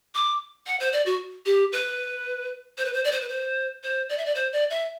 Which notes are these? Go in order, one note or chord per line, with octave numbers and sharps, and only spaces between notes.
D6
F#5
C5
D5
F#4
G4
B4
C5
B4
C5
D5
C5
B4
C5
C5
D5
E5
D5
C5
D5
E5